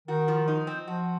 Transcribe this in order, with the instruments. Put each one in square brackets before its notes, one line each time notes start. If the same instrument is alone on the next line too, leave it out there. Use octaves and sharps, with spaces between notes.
[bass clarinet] D#3 [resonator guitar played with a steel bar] F#4
[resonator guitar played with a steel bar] F3
D#4
C4
[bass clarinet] F3 [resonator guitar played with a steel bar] F#4